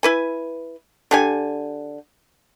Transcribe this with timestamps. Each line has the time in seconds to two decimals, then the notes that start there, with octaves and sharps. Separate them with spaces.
0.03 E4 B4 G#5
1.11 D3 G4 G#5